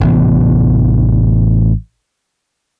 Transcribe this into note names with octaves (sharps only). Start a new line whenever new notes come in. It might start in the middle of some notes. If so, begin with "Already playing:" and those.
A1 C3 E3 B3